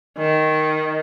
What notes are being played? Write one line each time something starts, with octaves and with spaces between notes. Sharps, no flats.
D#3